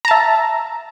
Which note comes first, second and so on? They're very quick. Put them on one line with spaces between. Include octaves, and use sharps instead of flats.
A#5 A5 E5